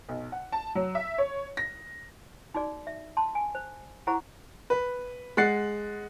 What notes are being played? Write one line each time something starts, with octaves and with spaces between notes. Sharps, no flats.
B1
F#5
A5
F#3
E5
C#5
A#6
D#4 F#4 G#4 D5
E5
A5 C6
G#5
C5
E4 G#4 C5 F#5 A#5 C#6
B4
G#3 F#5 F#6 A6 C7